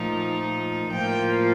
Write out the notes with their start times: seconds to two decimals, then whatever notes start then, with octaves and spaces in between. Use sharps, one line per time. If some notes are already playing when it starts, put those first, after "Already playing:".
Already playing: A#2 F3 A3 D#4
0.91 A2 F3 A#3 F4 G5